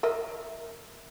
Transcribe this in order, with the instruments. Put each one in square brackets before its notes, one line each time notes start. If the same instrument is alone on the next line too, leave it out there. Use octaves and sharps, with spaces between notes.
[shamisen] A#4 D#5 E5